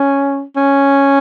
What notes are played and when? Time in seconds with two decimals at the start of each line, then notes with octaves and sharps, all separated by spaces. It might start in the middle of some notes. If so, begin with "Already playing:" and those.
Already playing: C#4
0.56 C#4